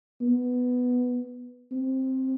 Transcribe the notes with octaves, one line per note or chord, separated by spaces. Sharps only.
B3
C4